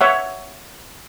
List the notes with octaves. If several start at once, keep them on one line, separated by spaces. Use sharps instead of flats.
C#5 E5 F#5